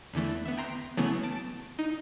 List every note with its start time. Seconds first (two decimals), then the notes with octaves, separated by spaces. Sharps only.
0.14 E2 D3 E3 A3
0.45 B3 E5
0.57 G5 A#5 C6 G6
0.97 C#3 E3 F#3 A3 B3
1.23 A5 A6 D7
1.79 D#4